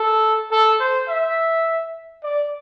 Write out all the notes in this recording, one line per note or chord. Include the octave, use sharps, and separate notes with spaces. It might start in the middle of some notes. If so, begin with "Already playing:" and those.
Already playing: A4
A4
C5
E5
D5